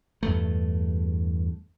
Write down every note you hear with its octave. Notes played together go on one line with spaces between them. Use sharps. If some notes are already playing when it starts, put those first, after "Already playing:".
E2 G2 A3